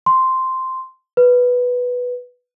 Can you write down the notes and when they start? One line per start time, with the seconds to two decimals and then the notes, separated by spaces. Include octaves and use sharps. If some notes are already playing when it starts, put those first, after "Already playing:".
0.06 C6
1.17 B4